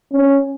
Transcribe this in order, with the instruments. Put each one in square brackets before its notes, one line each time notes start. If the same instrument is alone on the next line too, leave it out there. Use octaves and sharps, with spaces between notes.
[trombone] C#4